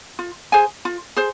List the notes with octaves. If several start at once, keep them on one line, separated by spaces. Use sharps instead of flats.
F4
G#4 C5 G#5
F4
G#4 C5